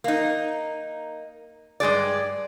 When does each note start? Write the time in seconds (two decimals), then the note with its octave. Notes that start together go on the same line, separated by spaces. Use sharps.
0.04 A#3 D#4
1.80 G2 G#3 G#4 D5